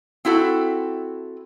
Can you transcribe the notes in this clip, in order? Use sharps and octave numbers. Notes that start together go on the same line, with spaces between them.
C4 E4 F#4 A4